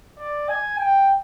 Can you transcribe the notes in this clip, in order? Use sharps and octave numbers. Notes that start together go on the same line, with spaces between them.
D5
G#5
G5